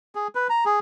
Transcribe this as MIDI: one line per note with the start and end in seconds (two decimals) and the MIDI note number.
0.15 0.28 68
0.35 0.47 71
0.50 0.64 82
0.66 0.79 68